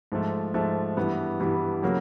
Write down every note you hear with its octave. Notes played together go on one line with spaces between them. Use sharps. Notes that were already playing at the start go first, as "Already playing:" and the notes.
G#2 F3 A3
G#2 F3 A3
G2 E3 G3 B3
G2 E3 G3 B3
C#3 F#3 A#3